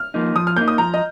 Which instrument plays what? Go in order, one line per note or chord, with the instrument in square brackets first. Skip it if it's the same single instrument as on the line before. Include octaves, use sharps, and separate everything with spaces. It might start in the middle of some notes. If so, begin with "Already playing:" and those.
Already playing: [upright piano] F6
[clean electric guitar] F3 A#3 D#4
[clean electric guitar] F3 [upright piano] D#6
[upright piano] F6
[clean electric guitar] A#3 D#4 [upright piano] G6
[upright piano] D#6
[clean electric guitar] F3 [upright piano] A#5
[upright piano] D#5